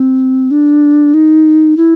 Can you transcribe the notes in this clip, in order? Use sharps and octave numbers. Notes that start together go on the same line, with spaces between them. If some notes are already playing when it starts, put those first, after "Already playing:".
Already playing: C4
D4
D#4
E4